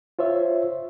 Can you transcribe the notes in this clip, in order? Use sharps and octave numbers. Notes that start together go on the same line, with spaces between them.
F4 C5 C#5 E5